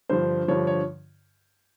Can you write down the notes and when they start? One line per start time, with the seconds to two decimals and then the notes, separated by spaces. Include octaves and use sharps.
0.09 G2 D3 F3 C5
0.48 G2 D3 F3 C#5
0.67 C#5